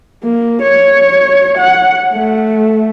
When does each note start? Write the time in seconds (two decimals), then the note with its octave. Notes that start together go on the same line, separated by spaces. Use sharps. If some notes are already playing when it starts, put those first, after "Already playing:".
0.23 A#3
0.62 C#5
1.58 F#5
2.14 A3